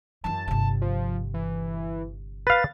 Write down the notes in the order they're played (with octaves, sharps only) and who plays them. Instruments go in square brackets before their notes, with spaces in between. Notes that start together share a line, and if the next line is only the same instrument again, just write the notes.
[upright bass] F#2 E3 [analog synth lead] A5
[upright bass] G1 C3
[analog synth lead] F3
E3
[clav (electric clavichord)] B4 F5 [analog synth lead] A6